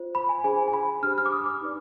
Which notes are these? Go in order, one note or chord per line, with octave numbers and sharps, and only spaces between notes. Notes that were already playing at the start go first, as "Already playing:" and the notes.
Already playing: F4 C5
B5
G#5
D4 G#4 C5 G#5
G#5
B5
D4 G4 C5 F6
F6
D6
D#6
D6
D#4 B4 D5